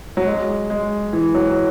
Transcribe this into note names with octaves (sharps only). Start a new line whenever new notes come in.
F#3
G#3
G#3
E3
F#3